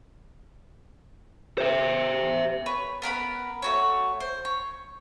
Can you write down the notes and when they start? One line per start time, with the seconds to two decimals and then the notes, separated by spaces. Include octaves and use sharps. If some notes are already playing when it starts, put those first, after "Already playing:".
1.58 C5 E5
2.66 B4 C#5
3.02 B3 A#4 B4 B5
3.62 A3 F#4 C#5
4.20 C5
4.45 C#5